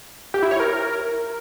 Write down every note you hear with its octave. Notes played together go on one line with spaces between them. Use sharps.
G4
E4
C#5
A#4